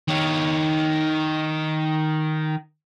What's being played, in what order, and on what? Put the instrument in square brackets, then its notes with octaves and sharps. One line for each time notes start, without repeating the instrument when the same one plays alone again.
[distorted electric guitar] D#3 C#5